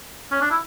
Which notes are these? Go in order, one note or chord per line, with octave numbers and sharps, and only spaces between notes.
C#4
D4
E4